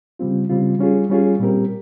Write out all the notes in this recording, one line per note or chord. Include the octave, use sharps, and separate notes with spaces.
C#3 G3 C4 F4
C#3 G3 C4 F4
G3 C#4 F4 G#4
G3 C#4 F4 G#4
A#2 G3 C4 G4 A#4